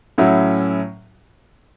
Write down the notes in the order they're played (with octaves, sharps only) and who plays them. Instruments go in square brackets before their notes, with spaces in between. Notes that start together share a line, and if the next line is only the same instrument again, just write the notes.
[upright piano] A2 F#3 C#4 E4